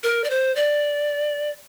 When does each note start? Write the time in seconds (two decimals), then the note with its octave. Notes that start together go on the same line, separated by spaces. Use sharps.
0.04 A#4
0.24 D5
0.30 C5
0.56 D5